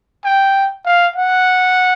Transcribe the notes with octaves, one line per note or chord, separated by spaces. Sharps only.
G5
F5
F#5